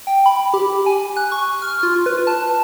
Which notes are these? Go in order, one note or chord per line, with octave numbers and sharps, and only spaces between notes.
G5
B5
G4
G#5
F#6
C#6
F6
F4
B4
A5